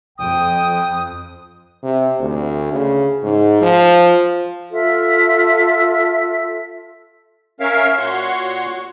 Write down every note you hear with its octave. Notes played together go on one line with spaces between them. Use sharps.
F2 G5 D#6
C3
D2
C#3
G#2
F3
F4 A4 E5
C#4 A#4 C#5 E5 F5
A#2 F#4 C#5 F#5 C6 C#6